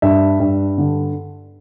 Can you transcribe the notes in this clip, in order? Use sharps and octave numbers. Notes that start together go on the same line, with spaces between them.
G2 E5
G2
D3